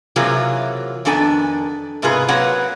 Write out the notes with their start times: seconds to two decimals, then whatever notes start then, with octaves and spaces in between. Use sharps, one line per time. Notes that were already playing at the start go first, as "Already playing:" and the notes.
0.16 C3 E3 F#3 A#3 F4 G#4
1.05 F2 D#3 B3 D4 A4 G#5
2.02 G#2 C3 B3 F4 G#4 B4
2.28 F#3 A#3 C4 B4 C#5 F#5